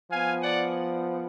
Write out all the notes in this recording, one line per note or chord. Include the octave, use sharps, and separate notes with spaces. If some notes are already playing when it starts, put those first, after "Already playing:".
F3 B3 F5 G#5
D5 F#5